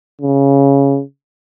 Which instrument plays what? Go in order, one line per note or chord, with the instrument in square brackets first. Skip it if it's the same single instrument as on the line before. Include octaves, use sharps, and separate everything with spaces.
[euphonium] C#3